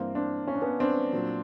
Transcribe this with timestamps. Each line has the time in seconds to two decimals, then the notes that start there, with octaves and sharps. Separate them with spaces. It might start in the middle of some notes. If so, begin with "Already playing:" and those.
Already playing: G2 E3 A#3 C4
0.15 C4 D4
0.48 C#4
0.54 D4
0.62 B3 C#4
0.80 C4 D4
1.13 A#2 F#3